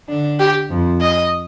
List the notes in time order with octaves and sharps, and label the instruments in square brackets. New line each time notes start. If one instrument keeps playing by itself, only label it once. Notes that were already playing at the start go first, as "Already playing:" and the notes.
[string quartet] D3 D4
[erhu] G4
[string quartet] F2 F3
[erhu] D#5